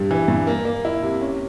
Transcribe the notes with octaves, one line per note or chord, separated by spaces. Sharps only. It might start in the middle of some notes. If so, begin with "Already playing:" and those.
Already playing: G2 G3
E3
G2
A#3
A#3
E4
C3
C#4